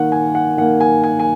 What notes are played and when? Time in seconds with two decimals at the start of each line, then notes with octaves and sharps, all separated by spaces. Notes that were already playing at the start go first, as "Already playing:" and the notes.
Already playing: D#3 A#3 F#5
0.12 G#5
0.35 F#5
0.57 D#3 F#5
0.61 A#3
0.81 G#5
1.04 G#5
1.19 G#5